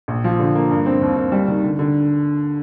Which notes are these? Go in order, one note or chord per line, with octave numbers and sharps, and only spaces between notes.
A#1
F3
D3
A#3
G2
C4
D#2
D#2
G3
D#3
D3
D3